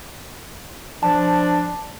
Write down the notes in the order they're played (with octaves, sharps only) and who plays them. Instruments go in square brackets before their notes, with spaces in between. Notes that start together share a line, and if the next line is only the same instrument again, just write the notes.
[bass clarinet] F3 [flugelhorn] D4 [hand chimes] A5